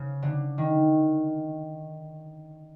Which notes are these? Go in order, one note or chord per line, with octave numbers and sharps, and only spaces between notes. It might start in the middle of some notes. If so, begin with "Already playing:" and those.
Already playing: C#3
D3
D#3